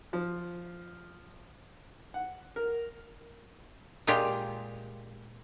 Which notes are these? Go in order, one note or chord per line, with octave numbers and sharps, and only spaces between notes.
F3
F#5
A#4
A#2 G#3 F4 G4